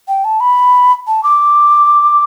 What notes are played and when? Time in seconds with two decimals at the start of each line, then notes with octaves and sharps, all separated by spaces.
0.08 G5
0.24 A5
0.40 B5
1.07 A5
1.23 D6